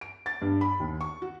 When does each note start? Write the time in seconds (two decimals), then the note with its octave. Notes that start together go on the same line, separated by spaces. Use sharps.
0.01 D7
0.26 A6
0.42 G2
0.61 B5
0.80 D#2
1.01 C#6
1.22 F#4